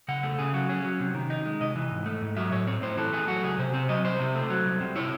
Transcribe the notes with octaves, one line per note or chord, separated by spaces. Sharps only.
C#3 F#5
A3
C#3 G#4
F#3 F#4
C#4 G#4
F#3
C3
D#3
D#4
G#3
C3 D#5
E3
G#2
A3
G#2
F#3 E5
A2 C#5
C4 C#5
A2 C5
E3 A4
A3 G#4
F#3 F#4
C#2 G#4
C3 C5
C4 C5
F#3 D#5
C2 C5
C3
A3
F#3
C2
C3
E4 C#5